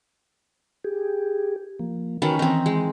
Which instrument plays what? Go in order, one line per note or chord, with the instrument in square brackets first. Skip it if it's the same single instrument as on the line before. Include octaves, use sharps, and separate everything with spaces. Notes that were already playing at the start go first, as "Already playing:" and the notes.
[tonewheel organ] G4 G#4
F3 A#3
[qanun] D#3 C#4 B4 [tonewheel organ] F#4
[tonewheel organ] E3 [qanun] C4 D#4
[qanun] G#3